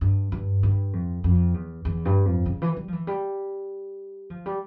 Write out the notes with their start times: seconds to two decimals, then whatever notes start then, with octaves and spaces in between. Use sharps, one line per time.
0.01 G2
0.32 G2
0.63 G2
0.93 F2
1.24 F2
1.54 E2
1.85 E2
2.05 G2
2.25 F2
2.46 C#3
2.62 E3
2.77 G3
2.88 F3
2.93 E3
3.07 G3
4.30 F3
4.46 G3